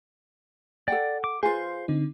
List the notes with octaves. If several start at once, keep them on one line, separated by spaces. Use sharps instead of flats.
A4 D5 F#5 G5
D6
F4 G#4 B4 C5 F5 G#5 C6
D3 C4 D#4